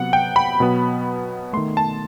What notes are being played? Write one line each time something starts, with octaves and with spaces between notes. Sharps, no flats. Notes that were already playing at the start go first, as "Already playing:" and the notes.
Already playing: C3 F#3 B3 F#5
G5
B5
B2 F#3 B3
D#3 A3 C6
A5